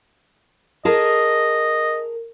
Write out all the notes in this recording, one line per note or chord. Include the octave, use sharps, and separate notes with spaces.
G#4 A#4 D#5 A5